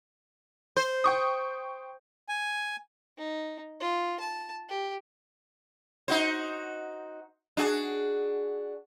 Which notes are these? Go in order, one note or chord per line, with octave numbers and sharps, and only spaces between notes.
C5
G5 C#6 D#6
G#5
D#4
F4
A5
G4
D#4 F#4 C5
D4 F#4 G#4